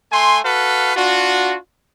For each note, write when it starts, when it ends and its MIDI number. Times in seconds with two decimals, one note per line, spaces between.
0.12 0.39 57
0.12 0.39 80
0.12 0.39 84
0.45 0.93 66
0.45 0.93 69
0.45 0.93 71
0.45 0.93 77
0.96 1.56 62
0.96 1.56 65
0.96 1.56 66